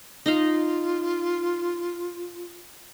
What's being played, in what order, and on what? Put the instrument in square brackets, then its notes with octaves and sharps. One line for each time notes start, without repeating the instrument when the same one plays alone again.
[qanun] D#4 D#5 F5 [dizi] F4